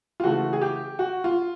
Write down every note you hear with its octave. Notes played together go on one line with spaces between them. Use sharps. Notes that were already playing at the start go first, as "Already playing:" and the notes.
F4
C#3 E3 A3 F#4
G#4
G4
F#4
F4